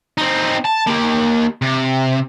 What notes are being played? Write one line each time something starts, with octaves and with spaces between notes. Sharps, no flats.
C4 D#4
A5
A#3 G4
C3